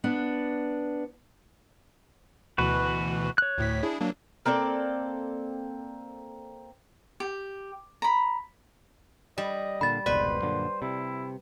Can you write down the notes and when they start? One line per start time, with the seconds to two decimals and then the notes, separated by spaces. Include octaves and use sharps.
0.04 B3 D4
2.58 D2 B2 E3 F#4 B4
3.38 C#5 F#6
3.58 D2 A2 B6
3.83 D4 E4 G#4
4.01 F#3 A#3 D4
4.46 A#3 C4 A4 D5
7.20 G4
8.02 A#5 B5
9.38 G3 D#5
9.81 A#2 D3 B5 A6
10.06 F1 C#2 B2 B4 C5 D5
10.42 F#2 A#2 D3
10.82 C3 E4